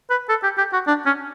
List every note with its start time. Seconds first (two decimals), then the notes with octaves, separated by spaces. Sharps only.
0.10 B4
0.29 A4
0.43 G4
0.58 G4
0.73 F#4
0.87 D4
1.06 C#4